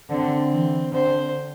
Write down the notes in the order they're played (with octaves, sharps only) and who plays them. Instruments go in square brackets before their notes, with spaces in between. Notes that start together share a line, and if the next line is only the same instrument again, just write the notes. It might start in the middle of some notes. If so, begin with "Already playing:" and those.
[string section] D3 [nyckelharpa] C4
[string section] E3
[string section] D3 [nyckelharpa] C5